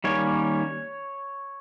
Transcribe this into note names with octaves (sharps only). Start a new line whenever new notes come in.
D#3 G3 A#3 C#4 C#5